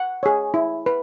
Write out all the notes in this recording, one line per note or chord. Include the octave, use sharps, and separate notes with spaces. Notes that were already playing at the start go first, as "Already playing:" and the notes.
Already playing: F#5
G#4 C#5
E4
B4